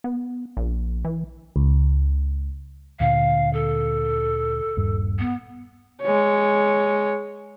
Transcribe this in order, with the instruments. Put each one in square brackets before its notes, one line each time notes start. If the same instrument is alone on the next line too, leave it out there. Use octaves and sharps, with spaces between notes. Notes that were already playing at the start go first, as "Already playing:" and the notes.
[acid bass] B3
A#1
E3
[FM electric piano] C#2
[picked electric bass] D2 A#2 D3 [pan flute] F5
[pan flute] A4
[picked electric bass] D#1 G2
[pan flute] B3
[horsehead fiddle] G#3 C#5